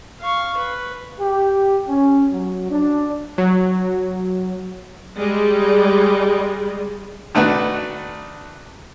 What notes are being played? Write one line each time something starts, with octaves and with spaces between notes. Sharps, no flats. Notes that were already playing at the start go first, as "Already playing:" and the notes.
F5 C#6
B4
G4
C#4
F#3
D4
F#3
G3 G#3
D#3 A3 D4 F#4 B4